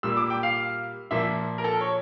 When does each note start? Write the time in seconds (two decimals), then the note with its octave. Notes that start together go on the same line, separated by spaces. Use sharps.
0.03 A#2 G3 A#3 E6
0.17 D6
0.30 G5
0.43 F5
1.11 A#2 F3 A#3 E5
1.58 A#4
1.64 A4
1.81 C#5